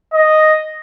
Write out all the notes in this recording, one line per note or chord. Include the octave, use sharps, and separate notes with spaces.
D#5